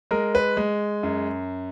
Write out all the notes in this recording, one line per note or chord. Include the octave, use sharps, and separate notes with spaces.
G#3 A#4
B4
G#3
F#2